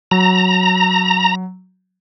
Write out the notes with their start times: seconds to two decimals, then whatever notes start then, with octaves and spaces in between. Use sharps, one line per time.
0.11 F#3 A#5